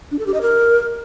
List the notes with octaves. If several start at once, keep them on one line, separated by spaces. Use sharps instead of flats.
D4
A4
G4
D#5
A#4